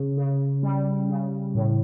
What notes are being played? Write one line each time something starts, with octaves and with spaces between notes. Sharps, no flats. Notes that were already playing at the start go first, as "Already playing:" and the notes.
Already playing: C#3
C#3
G3
C#3
A2